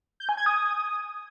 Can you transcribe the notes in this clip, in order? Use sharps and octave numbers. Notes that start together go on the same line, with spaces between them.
G6
G#5
G#6
D#6